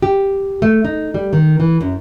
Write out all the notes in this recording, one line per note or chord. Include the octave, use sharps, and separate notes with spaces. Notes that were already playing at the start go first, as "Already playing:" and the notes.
G4
A3
D#4
G3
D#3
E3
F#2